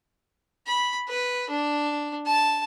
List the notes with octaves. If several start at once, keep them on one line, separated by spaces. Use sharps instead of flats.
B5
B4
D4
A5